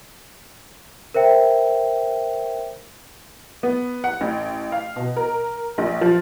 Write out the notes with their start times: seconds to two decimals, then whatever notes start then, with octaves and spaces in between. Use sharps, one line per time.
1.14 A#4 C5 E5 G5
3.63 B3
4.04 F#5
4.21 A1
4.72 F5
4.96 B2
5.16 A#4
5.78 A#1
6.01 F3